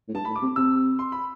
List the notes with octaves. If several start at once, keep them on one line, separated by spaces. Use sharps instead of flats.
A2
G2 A5
A2 B5
D6
C3
C3 E6
C6
B5